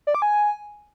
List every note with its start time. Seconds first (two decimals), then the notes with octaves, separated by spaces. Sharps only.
0.07 D5
0.15 D6
0.22 G#5